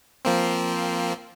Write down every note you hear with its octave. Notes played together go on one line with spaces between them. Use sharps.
F3 A#3 C4